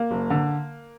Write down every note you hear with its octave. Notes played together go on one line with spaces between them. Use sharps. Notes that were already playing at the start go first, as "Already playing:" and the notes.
Already playing: A#3
F#1
D3